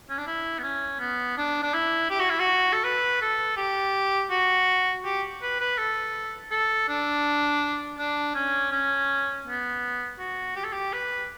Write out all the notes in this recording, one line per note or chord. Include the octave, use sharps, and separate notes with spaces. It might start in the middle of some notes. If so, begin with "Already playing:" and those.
C#4
D4
E4
B3
C#4
B3
D4
D4
E4
G4
F#4
E4
F#4
A4
B4
A4
G4
F#4
G4
B4
B4
A4
A4
D4
D4
C#4
C#4
B3
F#4
G4
A4
G4
B4